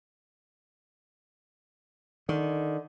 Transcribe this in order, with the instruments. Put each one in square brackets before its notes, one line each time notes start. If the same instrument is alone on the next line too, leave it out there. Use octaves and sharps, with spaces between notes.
[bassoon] D3 [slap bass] D#3